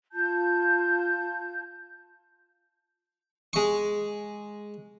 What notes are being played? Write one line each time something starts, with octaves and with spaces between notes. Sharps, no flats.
F4 A5 G6
G#3 C#6